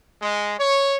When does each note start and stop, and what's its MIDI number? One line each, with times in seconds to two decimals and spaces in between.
0.22 0.53 56
0.59 0.96 73